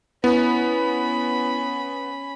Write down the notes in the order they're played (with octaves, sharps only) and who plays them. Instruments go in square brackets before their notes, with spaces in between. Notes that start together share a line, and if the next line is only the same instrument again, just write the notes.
[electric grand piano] B3 [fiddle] C#4 B5 [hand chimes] E4